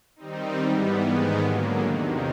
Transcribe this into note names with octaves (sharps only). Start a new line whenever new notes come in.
D#3 G3 C4 D#4
G#2 E3 G3 B3
G#2 D#3 G#3 B3
D3 F#3 A#3
E2 C3 D#3